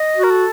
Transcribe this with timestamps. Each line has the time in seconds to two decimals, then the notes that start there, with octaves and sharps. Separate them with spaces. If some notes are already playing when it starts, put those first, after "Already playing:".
Already playing: D#5
0.16 F#4
0.23 A#4
0.30 A4